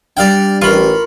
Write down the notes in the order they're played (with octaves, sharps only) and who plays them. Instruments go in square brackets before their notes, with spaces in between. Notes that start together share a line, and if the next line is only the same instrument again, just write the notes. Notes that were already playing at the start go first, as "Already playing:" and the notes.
[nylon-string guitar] G3 D4 [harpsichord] D5 F5 G5
[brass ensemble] A1 [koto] F4 [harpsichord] A#4 B5 C#6